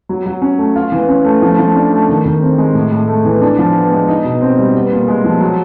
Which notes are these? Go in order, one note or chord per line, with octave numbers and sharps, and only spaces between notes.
F#3
F#3
C#4
A3
F4
E3
C#4
A3
F3
F3
D4
A3
D#3
D#3
C4
G#3
A2
A2
A3
E3
D4
F3
B3
G#3
D#4
B2
C4
G3
B3
A#2
G#3
F3
F#3